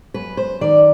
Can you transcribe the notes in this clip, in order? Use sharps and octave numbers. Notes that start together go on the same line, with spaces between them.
F#2 B4
C5
D#3 D5